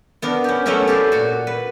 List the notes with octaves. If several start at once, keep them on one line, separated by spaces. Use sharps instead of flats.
B3 D4 A#4
C#4 G4
F#3 A3 B3 C#4 E4 A#4
G4 A4 D5 F5
A#2 F#4
B4